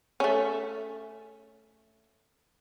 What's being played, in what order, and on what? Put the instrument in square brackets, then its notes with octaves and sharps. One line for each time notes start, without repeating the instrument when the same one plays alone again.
[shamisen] A3 C#4